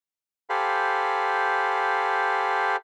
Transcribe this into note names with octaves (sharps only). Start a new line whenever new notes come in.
G4 A4 C5 F5 G#5 B5